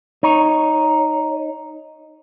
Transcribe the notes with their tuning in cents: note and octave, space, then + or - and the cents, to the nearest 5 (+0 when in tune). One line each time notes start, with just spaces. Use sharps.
D#4 +0 C#5 +0